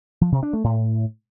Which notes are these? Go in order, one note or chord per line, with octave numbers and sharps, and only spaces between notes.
F3
C3
D4
A3
A2